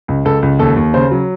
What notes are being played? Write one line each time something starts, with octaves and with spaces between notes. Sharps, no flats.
C#2
C#2 A4
C#2
D#2 A4
D#2
C#3 C5
F#3